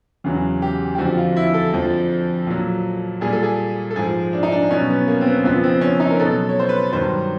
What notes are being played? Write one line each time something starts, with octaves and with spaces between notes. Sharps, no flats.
E2 C#3 F#3
G4
G4
F2 D3 F3 F#4
F4
E4
A4
F2 D3 F3
A#2 F#3
A#2 G3 G#4
A4
G#4
A4
G#2 F3 G#4
D4
D#4
D4
B2 F#3 C#4
B3
A#3
C4
B3
F2 C#3 F3 B3
C4
C#4
D#4
A#4
B2 F#3 A4
C#5
C5
B4
G2 D#3 F#3 C5